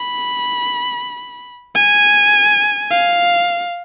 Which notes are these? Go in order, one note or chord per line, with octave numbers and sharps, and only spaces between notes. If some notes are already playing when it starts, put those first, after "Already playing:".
Already playing: B5
G#5
F5